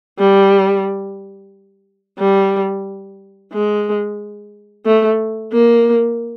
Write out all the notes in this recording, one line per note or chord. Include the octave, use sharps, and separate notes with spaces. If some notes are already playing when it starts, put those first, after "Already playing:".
G3
G3
G#3
A3
A#3